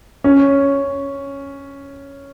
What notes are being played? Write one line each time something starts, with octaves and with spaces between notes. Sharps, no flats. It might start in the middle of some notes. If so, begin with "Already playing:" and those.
C#4